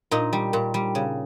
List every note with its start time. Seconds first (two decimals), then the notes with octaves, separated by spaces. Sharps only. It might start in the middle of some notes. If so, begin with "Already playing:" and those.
0.11 A#2 D#4
0.33 G3
0.53 A#2
0.74 G3
0.95 C#3